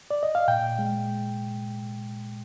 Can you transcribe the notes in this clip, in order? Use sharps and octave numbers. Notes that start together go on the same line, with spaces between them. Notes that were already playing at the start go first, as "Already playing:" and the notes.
D5
D#5
F5
A#2 G5
G#3